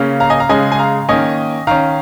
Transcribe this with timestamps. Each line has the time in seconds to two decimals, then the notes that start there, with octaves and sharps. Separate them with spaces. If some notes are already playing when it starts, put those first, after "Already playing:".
Already playing: C#3 A#3 C#4
0.20 F5 A#5
0.30 D#5 G#5
0.40 F5 A#5
0.49 C#3 G#3 C#4 D#5 G#5
0.72 G#5
0.79 F5 A#5
1.09 D#3 A#3 C#4 D#5 G#5
1.67 D#3 C#4 F5 A#5